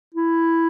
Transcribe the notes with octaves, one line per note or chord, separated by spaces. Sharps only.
E4